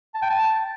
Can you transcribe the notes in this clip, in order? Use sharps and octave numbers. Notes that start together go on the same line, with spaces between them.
A5
G5
A5